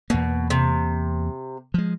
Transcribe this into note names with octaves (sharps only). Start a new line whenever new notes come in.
E2 B2 A#3
C3
F3 G#3